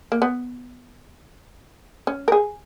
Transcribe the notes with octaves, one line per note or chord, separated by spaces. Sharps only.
A#3
B3
C#4
A#4
G#4